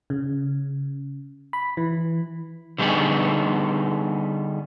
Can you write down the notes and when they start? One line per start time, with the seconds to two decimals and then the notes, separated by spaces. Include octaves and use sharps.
0.10 C#3
1.53 B5
1.77 E3
2.78 D3 G3 A3 B3 D#4 G#4